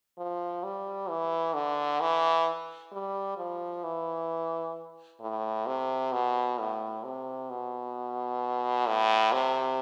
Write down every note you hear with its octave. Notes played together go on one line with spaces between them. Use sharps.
F3
G3
E3
D3
E3
G3
F3
E3
A2
C3
B2
A2
C3
B2
A2
C3